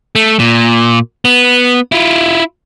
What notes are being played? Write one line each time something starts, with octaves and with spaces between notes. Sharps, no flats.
A3
A#2
B3
E4 F4